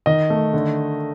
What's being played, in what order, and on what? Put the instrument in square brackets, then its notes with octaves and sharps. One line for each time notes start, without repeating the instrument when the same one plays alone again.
[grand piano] D#3 D#5
A3
D3